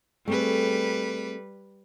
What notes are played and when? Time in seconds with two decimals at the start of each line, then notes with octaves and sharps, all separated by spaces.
0.28 G3 A3 C4 G#4 B4